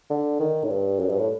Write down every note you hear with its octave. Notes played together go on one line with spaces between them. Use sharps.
D3
D#3
A2
G2
F#2
G2
A2